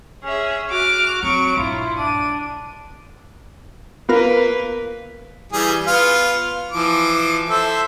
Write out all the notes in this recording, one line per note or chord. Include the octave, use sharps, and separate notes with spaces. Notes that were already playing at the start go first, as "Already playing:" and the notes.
C#4 G#4 E5
F#4 D6 F6
F#3 C4 C#6 D7
A#1 G2 E4 F4
D4 D#7
A#3 B3 F4 A#4 B4
E3 G3 G#4
B3 F4 F6
E3 F3 D6
A4 C5 E5